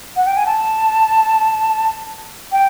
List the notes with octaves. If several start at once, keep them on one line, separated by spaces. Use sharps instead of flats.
F#5
G5
G#5
A5
G5